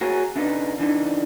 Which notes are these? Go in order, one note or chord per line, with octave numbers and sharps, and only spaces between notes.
F#4 G#4 A#4 C#5
C#3 D4 D#4 B4
C#3 E3 D4 D#4